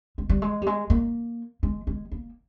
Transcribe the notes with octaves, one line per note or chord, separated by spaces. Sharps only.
G#3
G3
G#3
G3
G#3
A#3
G#3
G#3
A#3